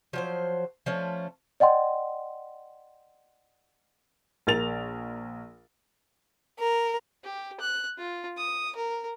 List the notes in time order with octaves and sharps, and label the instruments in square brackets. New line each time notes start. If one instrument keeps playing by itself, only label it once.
[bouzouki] F3 F#3 C5
F3 A3 C#4
[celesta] D5 D#5 F#5 G5 C6
[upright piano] A#1 A#4 A6 F7
[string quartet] A#4
[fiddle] G4
F#6
F4
D#6
A#4